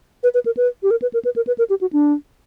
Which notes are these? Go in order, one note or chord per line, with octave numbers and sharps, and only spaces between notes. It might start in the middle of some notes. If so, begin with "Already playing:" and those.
B4
B4
A#4
B4
G4
A#4
B4
A#4
B4
A#4
B4
A#4
G4
F#4
D4